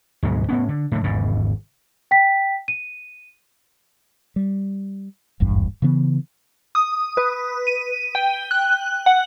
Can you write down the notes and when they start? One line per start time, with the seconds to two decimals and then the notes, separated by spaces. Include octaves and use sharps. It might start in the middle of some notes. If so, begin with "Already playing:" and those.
0.23 D2 G#2 B2 F#3
0.49 A2 B3 C#4
0.69 D3
0.92 A2 D3
1.04 G#1 E2 G#2 C#3
2.11 G5 B6
2.68 D#7
4.36 G3
5.40 D#1 G#1 E2 G2
5.82 C#3 E3 B3
6.75 D#6
7.17 B4
7.67 D#7
8.15 G5
8.51 F#6
9.06 F#5